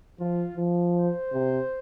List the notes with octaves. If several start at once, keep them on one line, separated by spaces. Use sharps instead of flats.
F3 F4
F3
C5
C3